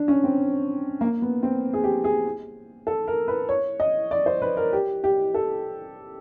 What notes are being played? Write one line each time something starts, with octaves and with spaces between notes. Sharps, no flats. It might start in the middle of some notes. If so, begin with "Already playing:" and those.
Already playing: D4
C#4
C4
A#3
B3
C4
G#4
G4
G#4
A4
A#4
B4
C#5
D#5
D5
C5
B4
A#4
G4
G4
A4